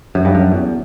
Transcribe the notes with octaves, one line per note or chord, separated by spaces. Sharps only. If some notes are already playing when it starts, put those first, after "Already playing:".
F#2
G2
F#2
E2